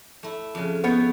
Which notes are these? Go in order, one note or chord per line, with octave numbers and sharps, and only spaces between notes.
A3 E4
F2 C#3
B3 B4 C#5 G5 C#7